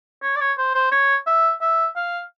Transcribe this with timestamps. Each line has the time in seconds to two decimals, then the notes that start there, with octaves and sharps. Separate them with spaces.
0.23 C#5
0.36 D5
0.40 C#5
0.58 C5
0.75 C5
0.92 C#5
1.27 E5
1.62 E5
1.96 F5